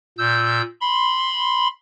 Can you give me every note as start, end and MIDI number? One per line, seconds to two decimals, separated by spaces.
0.18 0.62 46
0.18 0.62 88
0.18 0.62 91
0.81 1.68 83
0.81 1.68 84